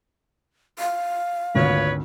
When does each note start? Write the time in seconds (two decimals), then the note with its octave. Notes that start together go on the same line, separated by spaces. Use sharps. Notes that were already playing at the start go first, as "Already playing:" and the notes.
0.79 F5
1.55 G#1 D2 A#2 B4 C#5